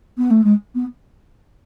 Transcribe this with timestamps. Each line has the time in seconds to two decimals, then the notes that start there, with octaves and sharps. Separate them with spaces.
0.18 B3
0.30 A3
0.44 G#3
0.75 B3